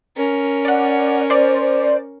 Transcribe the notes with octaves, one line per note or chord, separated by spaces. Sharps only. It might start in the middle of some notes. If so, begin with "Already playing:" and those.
C#4 A#4
D5 F#5
C5 D5